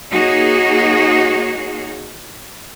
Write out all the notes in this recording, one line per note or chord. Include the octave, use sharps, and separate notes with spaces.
A#3 D#4 F#4 G#4 C#5